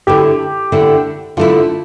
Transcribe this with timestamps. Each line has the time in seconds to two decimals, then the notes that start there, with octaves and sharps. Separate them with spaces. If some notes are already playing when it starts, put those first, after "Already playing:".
0.07 D3 A3 E4 G4
0.72 D3 A3 E4
1.37 D3 A3 E4 F4